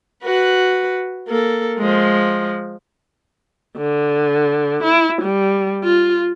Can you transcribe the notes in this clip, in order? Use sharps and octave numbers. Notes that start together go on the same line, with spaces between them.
F#4 B4
A#3 A4
F3 G#3
D3
E4
G3
F4